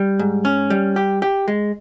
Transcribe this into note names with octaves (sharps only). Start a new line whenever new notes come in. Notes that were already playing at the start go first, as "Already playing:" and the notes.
Already playing: G3
G#2
C#4
G3
G4
G4
G#3